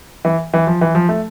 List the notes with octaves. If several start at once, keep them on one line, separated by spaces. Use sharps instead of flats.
E3
E3
F3
E3
F3
A3